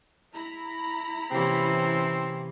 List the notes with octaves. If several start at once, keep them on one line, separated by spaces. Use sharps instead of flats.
E4 A#5 B5
C3 E3 A#3 C4 C#4